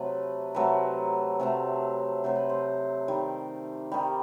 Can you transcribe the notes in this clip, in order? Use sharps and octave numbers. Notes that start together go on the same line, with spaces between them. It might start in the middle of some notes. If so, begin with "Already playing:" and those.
Already playing: C3 F#3 A3 B4
C3 F#3 A3 B4
C3 F#3 A3
C3 F#3 A3 C5
B4
C5
D#3 G3
D#3 G3